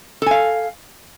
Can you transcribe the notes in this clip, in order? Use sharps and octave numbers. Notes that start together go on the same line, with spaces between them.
A4 F5 G#5